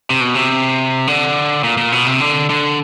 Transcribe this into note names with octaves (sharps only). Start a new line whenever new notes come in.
C3
B2
C3
D3
A#2
A#2
B2
C3
D3
D3